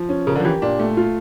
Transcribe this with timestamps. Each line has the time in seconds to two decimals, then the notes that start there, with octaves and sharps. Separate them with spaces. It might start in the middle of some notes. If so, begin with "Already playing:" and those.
Already playing: F3
0.09 C#4
0.27 C#3 A#4
0.36 D3
0.40 F3
0.45 E3 G4
0.62 A#2 D4
0.79 A3
0.97 F4